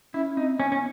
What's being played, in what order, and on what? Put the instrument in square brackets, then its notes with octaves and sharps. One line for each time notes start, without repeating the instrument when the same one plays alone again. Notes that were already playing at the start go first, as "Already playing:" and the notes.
[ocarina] C#4 [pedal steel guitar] E4
[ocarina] C4 [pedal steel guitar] D#4
[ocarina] B3 [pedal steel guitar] C#4
[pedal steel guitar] C#4